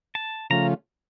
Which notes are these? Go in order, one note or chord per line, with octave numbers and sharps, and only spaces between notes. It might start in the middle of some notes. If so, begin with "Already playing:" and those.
A5
C#3 F3 A3 C#4 F4 A#5